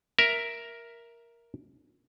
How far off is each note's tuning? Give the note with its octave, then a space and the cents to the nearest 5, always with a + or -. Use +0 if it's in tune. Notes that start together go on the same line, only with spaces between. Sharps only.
A#4 +5 E5 +0